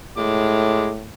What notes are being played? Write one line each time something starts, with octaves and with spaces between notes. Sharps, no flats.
A2 G#3 D6